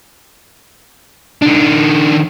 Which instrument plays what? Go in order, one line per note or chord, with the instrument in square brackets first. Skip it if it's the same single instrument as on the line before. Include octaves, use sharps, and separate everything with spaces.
[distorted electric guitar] D#3 D4